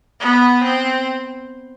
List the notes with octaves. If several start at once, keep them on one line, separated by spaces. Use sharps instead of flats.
B3
C4